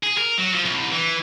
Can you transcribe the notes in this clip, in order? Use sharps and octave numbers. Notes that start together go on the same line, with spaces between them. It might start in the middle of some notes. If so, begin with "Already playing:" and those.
G#4
A#4
F#3
F3
C2
E3